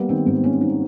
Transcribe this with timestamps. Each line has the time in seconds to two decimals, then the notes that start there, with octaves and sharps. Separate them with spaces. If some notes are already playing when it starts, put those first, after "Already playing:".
Already playing: G3 A#3 B3
0.09 D#3 C4
0.26 G#2 C4
0.44 A#3 C#4
0.61 G3 D#4